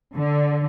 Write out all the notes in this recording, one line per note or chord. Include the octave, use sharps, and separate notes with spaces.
D3